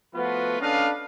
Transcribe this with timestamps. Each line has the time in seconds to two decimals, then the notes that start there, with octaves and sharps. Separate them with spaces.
0.14 F3 A3 B3 F4 F#4 B4
0.61 C#4 D4 A4 B4 D#5 F5